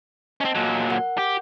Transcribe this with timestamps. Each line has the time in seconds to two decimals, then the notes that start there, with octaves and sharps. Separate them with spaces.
0.41 C4 C#4 D#5 A5
0.55 A#2 F#3
0.90 A#4 F#5
1.18 G4